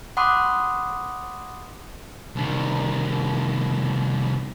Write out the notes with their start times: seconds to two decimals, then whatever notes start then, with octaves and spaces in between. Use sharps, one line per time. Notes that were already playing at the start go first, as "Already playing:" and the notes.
0.17 F#5 B5 C6 D6 D#6 F#6
2.36 C2 D#3